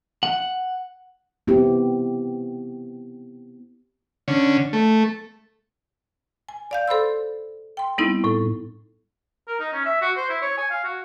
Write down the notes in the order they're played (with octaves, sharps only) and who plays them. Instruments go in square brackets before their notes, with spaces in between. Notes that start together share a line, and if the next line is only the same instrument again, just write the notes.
[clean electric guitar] F#5
[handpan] B3 C4 E4 G4
[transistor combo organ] D3 C#4
A3
[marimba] G#5
D5 F5 G6
A4 C5 B5 C6 E6
G5 C6
G3 B3 C4 D#4 E4
A2 A4
[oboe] A#4
D#4
C#4
E5
F#4
C5
E4
C#5
G#5
F5
F#4